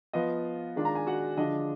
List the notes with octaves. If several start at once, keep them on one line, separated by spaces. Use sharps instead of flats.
F3 B3 F4 D#5
D#3 G#3 D4 F4
A#5
G#5
F#4 F#5
D3 F3 G#3 D4 F4 D#5